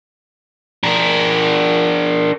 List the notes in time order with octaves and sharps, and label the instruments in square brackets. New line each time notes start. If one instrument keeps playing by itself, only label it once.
[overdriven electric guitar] D4 A#4